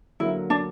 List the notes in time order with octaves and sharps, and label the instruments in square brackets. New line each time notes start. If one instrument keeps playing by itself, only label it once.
[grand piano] D3 F#3 A#3 [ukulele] E4
[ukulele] D4